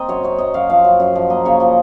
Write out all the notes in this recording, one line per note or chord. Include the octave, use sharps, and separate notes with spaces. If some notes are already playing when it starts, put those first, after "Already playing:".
Already playing: C4 A#4 D#5
F#2 C#5
F#2 C#5
F#2 D#5
F#2 F5
F3 F5
F#2
F#2
F3
A#3 D#5
C#3 C#5
F3 D#5